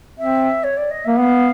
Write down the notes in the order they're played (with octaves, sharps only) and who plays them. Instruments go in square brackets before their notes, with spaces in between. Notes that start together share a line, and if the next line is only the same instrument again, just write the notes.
[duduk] C4 [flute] E5
[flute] C#5
D5
D#5
[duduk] A#3 [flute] E5
[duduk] B3 [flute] F5